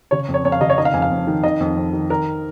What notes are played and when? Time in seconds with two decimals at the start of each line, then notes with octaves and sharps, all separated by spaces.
0.11 C#3 C#5
0.28 F2
0.34 C#5
0.45 F2 C#5
0.52 F5
0.61 C#3 D#5
0.70 C#5
0.78 D#3 D#5
0.85 F5
0.94 F2 G#5
1.02 F5
1.11 F2
1.27 D#3
1.44 D#3 D#5
1.60 F2
1.77 F2
1.93 D#3
2.10 D#3 A#4